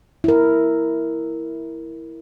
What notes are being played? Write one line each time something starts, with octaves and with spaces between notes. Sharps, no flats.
E4 A#4